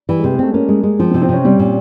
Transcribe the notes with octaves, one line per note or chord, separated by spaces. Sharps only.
E3 G3
G#3
C3
G#3
A3 C4
A#3 C#4
G#3
G#3
F3 C4
C4
C3
C4
C3 C#4
G3 C4
A#2